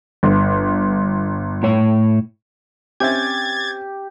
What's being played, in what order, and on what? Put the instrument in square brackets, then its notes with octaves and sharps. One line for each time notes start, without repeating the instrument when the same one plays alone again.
[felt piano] G1
[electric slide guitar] A2 C#5
[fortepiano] C4 C#4 E5 [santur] G4 [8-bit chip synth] G#6 A6